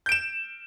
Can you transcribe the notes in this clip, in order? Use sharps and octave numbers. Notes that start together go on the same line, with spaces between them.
G6 D7 E7